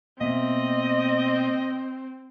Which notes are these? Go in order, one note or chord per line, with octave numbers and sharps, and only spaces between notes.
B2 A#3 C4 D#5 E5